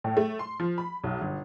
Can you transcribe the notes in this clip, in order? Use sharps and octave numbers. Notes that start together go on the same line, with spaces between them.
A2
A3
C6
F3
B5
B1
G1